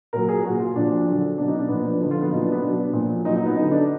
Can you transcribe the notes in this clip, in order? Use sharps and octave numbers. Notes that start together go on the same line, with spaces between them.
A#2 F#3 A#4
G#4
A#2 F#3 F#4
F4
A#2 F3 D4
D3 F#3
B2 F#3 D4
D#4
D4
A#2 F3 B3
D4
D3 F3 D#4
F4
B3
A#2 F#3 D#4
D4
B3
B2 F#3 D4
A#2 F3
A#2 F#3 D#4
D#4
B3
D3 F#3 D#4
D4